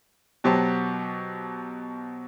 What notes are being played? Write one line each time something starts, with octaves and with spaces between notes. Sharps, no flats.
B2 F#3 G4 C5 C#5 A5